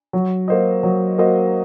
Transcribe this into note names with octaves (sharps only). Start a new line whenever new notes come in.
F#3
A#3 F#4 C5 D#5
F#3
A#3 F#4 C5 D#5